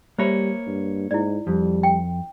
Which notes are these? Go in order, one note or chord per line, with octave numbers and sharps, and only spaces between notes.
G3 A#3 C5 C#5 E5 B5
G2
G#2 E4 D5
F2 G3
G5